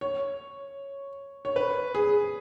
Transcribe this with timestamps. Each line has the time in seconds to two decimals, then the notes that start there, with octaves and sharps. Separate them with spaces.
0.01 C#5
1.45 C#5
1.56 B4
1.95 G#4